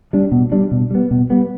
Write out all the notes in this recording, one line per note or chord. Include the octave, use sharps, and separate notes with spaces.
G3 D4
B2
G3 D4
B2
G3 B3
B2
G3 B3